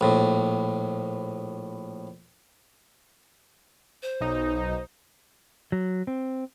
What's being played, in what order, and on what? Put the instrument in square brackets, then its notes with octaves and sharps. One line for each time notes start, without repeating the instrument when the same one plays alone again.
[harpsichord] A#1 A2
[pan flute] C5
[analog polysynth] B1 D#4
[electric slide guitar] F#3
C4